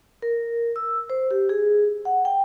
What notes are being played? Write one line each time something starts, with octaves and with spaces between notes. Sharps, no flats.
A#4
E6
C5
G4
G#4
F#5
G5